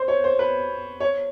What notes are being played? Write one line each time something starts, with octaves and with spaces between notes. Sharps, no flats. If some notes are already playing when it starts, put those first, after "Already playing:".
Already playing: C5
C#5
C5
B4
C#5